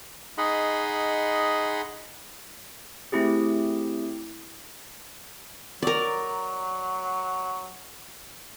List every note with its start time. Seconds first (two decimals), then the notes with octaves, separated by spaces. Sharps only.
0.38 D#4 G#4 D#5 F#5 B5 C6
3.12 A3 C4 E4 G4 G#4
5.82 F#3 A#4 D5